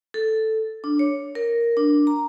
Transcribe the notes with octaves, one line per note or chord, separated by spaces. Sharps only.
A4
D4
C#5
A#4
D4
A#5